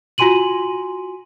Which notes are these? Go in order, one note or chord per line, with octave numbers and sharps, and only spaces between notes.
F4 F#4 G#5 C6 D#7 F#7